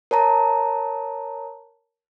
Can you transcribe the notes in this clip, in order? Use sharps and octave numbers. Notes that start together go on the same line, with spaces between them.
A#4 C#5 A5 A#5